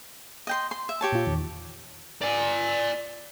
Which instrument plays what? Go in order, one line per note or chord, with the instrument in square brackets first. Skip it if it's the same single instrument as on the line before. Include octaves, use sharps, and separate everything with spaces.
[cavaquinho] D#5 G5 C6
C6
E5
G4 C#5 A5
[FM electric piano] A#2 F4
E2 D#3
[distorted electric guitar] D5 G#5